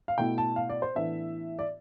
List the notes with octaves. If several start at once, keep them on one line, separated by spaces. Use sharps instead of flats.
F5
B2 A3 E4 G5
A5
F5
D5
C5
A2 E3 B3 D4 E5
D5